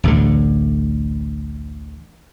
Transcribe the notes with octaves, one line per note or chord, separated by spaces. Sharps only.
A1 D2 A2 D3